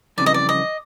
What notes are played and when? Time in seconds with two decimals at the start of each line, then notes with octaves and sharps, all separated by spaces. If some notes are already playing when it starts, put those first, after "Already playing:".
0.18 F2 C#3 E3 G3 C4 D5
0.26 D#5
0.34 D5
0.49 D#5